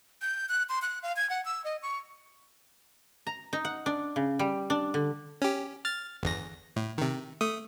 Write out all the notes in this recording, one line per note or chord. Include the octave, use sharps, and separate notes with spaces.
G6
F#6
C6
F#6
F5
G#6
F#5
E6
D#5
C#6
A#5
D#4
F#5
D4
C#3
G3
D4
D3
C#4 G4
F6 A6
G1 E2 A#6
A2
C3 D#3
A3 D#6